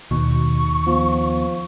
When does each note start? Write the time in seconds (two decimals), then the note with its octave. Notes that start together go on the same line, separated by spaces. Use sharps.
0.11 D#2 B2 C#6
0.87 F3 B3